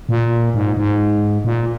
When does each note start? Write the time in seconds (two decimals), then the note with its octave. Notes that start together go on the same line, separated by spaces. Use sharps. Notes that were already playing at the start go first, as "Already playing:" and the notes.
0.09 A#2
0.54 G#2
0.77 G#2
1.45 A#2